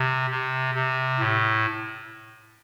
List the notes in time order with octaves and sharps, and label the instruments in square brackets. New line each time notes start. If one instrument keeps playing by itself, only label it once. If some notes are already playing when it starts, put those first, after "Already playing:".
Already playing: [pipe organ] C3
C3
C3
A2